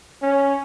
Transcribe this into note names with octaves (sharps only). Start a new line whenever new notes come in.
C#4